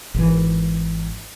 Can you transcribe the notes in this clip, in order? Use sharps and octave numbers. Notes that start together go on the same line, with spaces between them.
G#1 E3